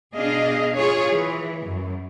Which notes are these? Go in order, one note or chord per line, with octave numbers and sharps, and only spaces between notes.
B2 D4 G#4 D#5 F5
F4 G#4 C#5
E3
F#2